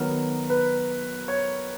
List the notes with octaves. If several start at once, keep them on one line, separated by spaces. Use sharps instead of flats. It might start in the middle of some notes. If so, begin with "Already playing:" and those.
Already playing: D#3 F#3 B3 A#4
B4
C#5